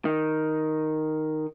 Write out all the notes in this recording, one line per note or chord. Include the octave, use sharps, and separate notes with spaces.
D#3